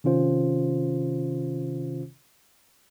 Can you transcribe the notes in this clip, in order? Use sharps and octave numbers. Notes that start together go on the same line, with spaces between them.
C3 D#3 C#4 F4 C5